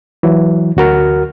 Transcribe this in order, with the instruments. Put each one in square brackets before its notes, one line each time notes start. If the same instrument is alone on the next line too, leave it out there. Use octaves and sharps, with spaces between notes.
[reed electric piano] E3 F#3
D2 F#4 A#4 F6